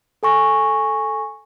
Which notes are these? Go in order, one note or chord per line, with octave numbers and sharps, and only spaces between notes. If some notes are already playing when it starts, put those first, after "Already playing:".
A4 G#5 C#6 A#6